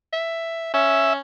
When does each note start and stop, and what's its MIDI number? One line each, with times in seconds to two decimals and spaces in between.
0.13 0.69 76
0.74 1.19 61
0.74 1.13 76